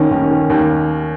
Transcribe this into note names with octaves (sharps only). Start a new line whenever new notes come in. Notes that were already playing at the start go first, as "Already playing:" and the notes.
Already playing: D#2 D#3 C#4
D#2
D#3
D#2